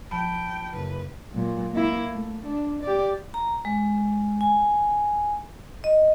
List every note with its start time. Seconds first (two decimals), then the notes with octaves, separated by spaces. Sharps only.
0.11 F3 G5 A5 B5
0.73 F#1 B4
1.33 A#2 F#3
1.74 A#3 E4
2.10 A3
2.46 D4
2.83 G4 D5
3.34 A#5
3.65 G#3
4.41 G#5
5.84 D#5